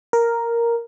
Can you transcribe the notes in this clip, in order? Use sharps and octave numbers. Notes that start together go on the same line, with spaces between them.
A#4